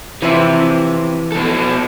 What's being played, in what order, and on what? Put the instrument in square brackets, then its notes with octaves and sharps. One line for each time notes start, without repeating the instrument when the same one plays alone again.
[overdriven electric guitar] C3 [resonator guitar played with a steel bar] E3 F3 E4
[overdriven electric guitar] B2 A4